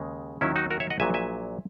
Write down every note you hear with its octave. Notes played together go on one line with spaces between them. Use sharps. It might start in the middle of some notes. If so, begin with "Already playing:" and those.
Already playing: D#2 C#3 G#3
D#2 D#3 F#3 C#4 E4
D#4 F#4
F#4 A#4
C#5 E5
D#5 F#5
A#1 A#2 F#3 E5 G#5
E5 G#5